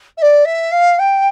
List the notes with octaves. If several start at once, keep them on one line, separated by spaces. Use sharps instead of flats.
E5
D5
E5
F5
G5